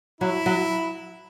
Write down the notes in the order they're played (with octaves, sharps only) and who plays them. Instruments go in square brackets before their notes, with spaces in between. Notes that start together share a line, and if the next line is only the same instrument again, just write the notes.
[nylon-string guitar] F#3 [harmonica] E4
[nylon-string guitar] F#3